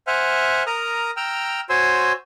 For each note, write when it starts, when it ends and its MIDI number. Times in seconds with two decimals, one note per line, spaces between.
0.07 0.63 72
0.07 0.63 76
0.07 0.63 78
0.07 0.63 80
0.07 0.63 89
0.67 1.11 70
0.67 1.11 82
0.67 1.11 87
0.67 1.11 89
1.17 1.61 79
1.17 1.61 82
1.17 1.61 88
1.17 1.61 89
1.69 2.12 66
1.69 2.12 72
1.69 2.12 73
1.69 2.12 80
1.69 2.12 84
1.69 2.12 88